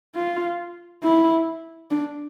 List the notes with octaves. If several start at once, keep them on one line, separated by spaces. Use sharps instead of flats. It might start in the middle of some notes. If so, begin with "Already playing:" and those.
F4
E4
D4